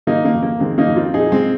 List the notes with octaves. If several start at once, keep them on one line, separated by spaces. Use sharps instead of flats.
D#3 A#3 D#4
A#3
F2
A#3
D#3 G#3 C4
A#3 D#4
F2
C4 F4
A#2 D#4 G#4
G#3 C4